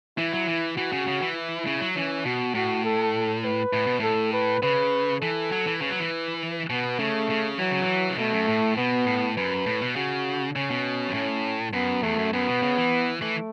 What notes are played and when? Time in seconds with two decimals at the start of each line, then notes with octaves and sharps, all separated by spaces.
0.17 E3 E4
0.33 F#3
0.48 E3
0.77 E3 F#4
0.92 C#3
1.07 C#3
1.22 E3
1.36 E4
1.67 C#3
1.81 F#3
1.96 E3 C#4
2.25 B2 F#4
2.55 A2 F#4
2.84 A4
3.44 B4
3.73 A2
3.86 B2
4.00 A2 A4
4.33 B4
4.63 C#3 B4
5.21 E3 A4
5.52 F#3
5.66 E3
5.81 C#3 B4
5.90 F#3
6.00 E3
6.70 B2 B3
6.99 C#3 A3
7.30 C#3
7.59 E3 F#3
7.71 C#3
7.81 E3
8.10 C#3
8.18 B2 A3
8.33 F#2
8.48 A2
8.77 B2 B3
9.06 A2
9.37 F#2 B4
9.66 A2
9.82 B2
9.96 C#3 F#4
10.55 C#3 C#4
10.70 B2
11.08 F#2
11.14 A2
11.73 F#2 B3
12.03 E2 A3
12.18 F#2
12.33 F#2 B3
12.48 B2
12.62 C#3
12.77 E3
13.22 E3 A3